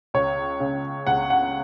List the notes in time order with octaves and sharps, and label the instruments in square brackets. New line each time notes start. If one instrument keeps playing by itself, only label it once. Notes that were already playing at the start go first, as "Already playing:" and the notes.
[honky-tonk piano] C#2 C#5
C#3
C#2 F#5
F#5